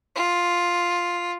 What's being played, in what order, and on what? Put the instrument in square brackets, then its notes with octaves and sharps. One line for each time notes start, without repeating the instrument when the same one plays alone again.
[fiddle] F4